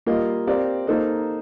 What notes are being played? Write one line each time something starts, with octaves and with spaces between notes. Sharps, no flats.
G3 A#3 F4 A#4 D#5
C4 G4 A#4 D5 F5
A#3 D#4 A4 C5 D#5